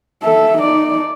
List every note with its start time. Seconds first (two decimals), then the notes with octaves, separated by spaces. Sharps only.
0.23 A4 E5
0.58 D#4 D5